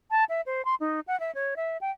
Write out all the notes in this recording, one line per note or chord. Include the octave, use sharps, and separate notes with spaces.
A5
E5
C5
C6
D#4
F#5
E5
C#5
E5
G5